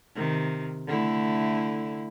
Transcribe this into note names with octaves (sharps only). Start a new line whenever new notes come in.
C3 D#3
D3 A3 E4